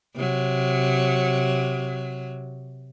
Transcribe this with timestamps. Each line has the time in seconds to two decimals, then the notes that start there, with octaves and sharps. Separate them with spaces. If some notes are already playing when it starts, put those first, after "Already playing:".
0.15 C3 F#3